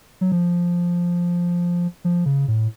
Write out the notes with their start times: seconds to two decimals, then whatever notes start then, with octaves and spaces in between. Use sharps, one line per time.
0.21 F#3
0.32 F3
2.05 F3
2.26 C#3
2.48 A2